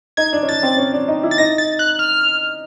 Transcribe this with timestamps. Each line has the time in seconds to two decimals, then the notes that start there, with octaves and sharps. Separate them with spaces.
0.17 D#4 G#6
0.33 D4
0.43 C#4
0.48 D4 A6
0.63 C4
0.78 C#4
0.93 D4
1.08 D#4
1.23 E4
1.31 A6
1.38 D#4 A#6
1.58 A6
1.79 F#6
1.99 F6